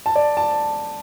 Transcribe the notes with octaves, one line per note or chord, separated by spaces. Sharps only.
A5
D5
A5